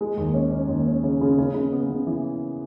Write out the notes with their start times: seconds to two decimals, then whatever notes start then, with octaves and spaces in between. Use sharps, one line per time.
0.01 G#3
0.17 D#2
0.34 C#4
0.51 C#4
0.68 D#2
0.87 C#4
1.03 C#3
1.21 C#3
1.38 C#3
1.54 C#3
1.72 B3
1.90 C#3
2.07 E3